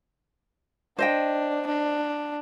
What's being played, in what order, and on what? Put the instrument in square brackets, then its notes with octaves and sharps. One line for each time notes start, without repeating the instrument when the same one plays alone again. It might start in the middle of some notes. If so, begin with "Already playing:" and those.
[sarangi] D4 [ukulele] C5 D#5 G5
[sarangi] D4